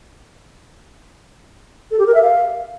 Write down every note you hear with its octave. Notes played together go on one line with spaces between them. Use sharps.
A4
G4
A#4
E5
F5